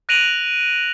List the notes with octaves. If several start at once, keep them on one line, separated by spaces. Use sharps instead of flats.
F#6 A#6 D7 D#7 F7 F#7